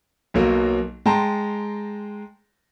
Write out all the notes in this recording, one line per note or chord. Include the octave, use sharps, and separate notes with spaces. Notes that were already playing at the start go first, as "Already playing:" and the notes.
B1 B2 F#3 A#3
G#3 G5 A5 A#5 C6